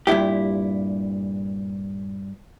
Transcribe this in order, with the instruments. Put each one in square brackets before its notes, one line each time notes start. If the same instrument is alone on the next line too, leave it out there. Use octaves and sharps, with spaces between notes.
[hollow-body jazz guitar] G2 A#2 E4 G4